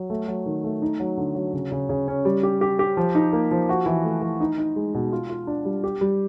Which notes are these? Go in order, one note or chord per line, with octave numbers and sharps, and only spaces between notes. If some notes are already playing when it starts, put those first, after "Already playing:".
Already playing: F#3
A3
F#3
D#3
A3
D#4
F#3
D3
F#3
C#3
C#3
C#3
C#4
G3
G4
G4
G4
F3
D#4
A#3
F3
F#4
E3
A3
E3
D#4
D#4
G#3
B2
F4
F4
D4
G3
G4
G3